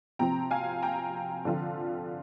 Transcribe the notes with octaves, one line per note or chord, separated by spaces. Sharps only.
C3 F3 C4 G5 A#5
F5 G#5
G5 A#5
D3 F3 C4 F4